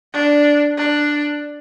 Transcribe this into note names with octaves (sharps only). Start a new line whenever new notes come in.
D4
D4